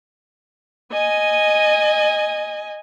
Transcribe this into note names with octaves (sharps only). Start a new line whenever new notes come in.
D#5 G#5